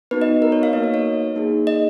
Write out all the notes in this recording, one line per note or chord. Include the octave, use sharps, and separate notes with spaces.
B3 D#4 F#4 B4
D#5
A#4
C#5
F5
A#3 D#4 F#4 D#5
C#5
C#5
A#3 D#4 G#4
D#5